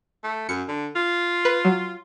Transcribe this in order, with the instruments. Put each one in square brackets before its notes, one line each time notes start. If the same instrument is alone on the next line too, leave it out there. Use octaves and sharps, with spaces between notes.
[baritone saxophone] A3
[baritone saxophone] F#2 [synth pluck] C#7
[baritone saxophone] D3
F4
[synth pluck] B4
F#3